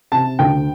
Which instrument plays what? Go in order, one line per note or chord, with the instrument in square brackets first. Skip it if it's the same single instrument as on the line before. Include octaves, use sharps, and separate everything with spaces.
[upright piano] C3 A5
D2 G5